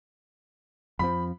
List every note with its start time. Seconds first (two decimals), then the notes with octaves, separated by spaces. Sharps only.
0.99 F2 F3 C4 B5